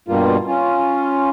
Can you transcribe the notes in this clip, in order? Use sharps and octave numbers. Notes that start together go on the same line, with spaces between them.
G2 B2 G3 A#3 F4
C#4 F4